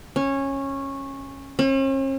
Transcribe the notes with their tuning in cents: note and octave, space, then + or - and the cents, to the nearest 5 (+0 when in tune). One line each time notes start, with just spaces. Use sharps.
C#4 -15
C#4 -45